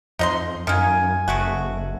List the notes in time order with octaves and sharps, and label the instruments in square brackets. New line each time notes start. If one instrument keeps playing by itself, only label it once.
[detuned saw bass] F2 [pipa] D#4 D#5 C6
[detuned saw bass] F#2 [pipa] D#3 A#3 [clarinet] G#5
[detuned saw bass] F#1 [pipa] G#3 A3 F#4